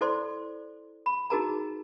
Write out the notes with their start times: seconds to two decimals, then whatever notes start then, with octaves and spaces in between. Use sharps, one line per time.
0.01 E4 A4 C5 D5 C6
1.06 B5
1.30 D#4 F#4 G#4 A#4 A5 A#5